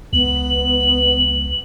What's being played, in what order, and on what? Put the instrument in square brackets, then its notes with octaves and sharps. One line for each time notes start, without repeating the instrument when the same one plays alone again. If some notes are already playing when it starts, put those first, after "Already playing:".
[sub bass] C#2 [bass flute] B3 [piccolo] F#7